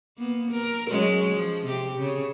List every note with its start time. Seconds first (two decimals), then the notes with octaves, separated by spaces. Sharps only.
0.18 A#3 B3
0.51 A#4
0.89 F#3 G#3 C#4
1.33 F3
1.65 C3 G4
1.98 C#3